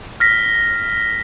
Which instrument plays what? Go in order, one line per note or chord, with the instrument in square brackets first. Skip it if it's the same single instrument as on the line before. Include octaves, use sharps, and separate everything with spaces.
[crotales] F6 A#6 B6